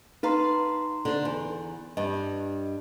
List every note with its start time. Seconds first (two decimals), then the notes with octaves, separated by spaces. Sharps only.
0.23 D#4 B4 F5 A#5 C6
1.05 D3 C5
1.25 E2
1.97 G2 D#5